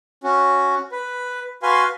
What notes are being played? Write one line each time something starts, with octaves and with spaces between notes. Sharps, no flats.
C#4 F#4
B4
F#4 B4 F5 G#5 C6